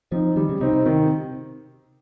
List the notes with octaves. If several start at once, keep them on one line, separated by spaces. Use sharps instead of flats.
F3 C4 D#4
D#3 G3
C#3
C3 C4 D#4
C3
C3 D#3
C3